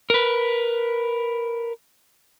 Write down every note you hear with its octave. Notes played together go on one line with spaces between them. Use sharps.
A#4 B4